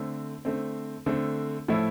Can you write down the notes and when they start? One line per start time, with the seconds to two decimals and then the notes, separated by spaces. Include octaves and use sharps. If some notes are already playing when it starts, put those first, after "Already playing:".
Already playing: D3 A3 C4
0.45 D3 A3 C4
1.06 D3 A3 C4
1.68 A2 F3 A3 E4